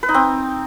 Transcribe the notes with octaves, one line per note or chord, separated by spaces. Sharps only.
B4
D#4
C4